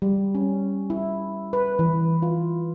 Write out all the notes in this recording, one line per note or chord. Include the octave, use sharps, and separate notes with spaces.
G3
C#4
E4
B4
E3
F4